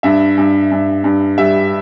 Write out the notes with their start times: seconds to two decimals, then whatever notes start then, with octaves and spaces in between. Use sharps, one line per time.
0.03 G2 E5
0.38 G2
0.71 G2
1.04 G2
1.38 G3 E5